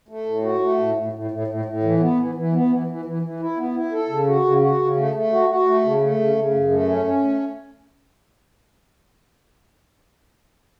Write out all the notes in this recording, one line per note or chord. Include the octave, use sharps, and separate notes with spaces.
A3
A2
F#4
A3
A2
A2
A2
A2
A2
A2
E3
B3
E3
E3
B3
E3
E3
E3
E3
E4
B3
E4
A4
C#3
F#4
C#3
F#4
C#3
A3
A3
F#4
F#4
A3
C#3
A3
C#3
C#3
F#2
A3
C#4
C#4
A3